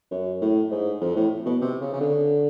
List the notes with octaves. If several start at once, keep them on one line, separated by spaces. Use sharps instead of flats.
F#2
A2
G#2
F2
A2
B2
C3
C#3
C#3
D3